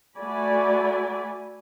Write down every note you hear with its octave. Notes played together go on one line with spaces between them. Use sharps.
A3 F#4 D5 G#5 B5